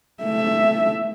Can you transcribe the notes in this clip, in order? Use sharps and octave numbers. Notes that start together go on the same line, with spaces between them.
A3 E5